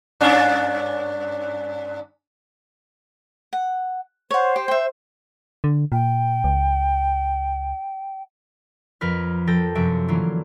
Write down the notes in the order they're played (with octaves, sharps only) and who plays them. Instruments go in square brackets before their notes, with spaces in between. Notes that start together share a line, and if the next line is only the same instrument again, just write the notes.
[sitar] G2 C#4 D4
[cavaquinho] F#5
[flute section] C5 [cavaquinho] C#5 F#5
[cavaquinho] G4
E5 G5
[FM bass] D3
[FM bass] A#2 [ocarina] G5
[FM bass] C#2
[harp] F2 F3 A#4 B4 F6
F3 A4 G5 A#6
F#2 C3 F3 F#4 E5 D7
D3 E3 F#3 A#3 F4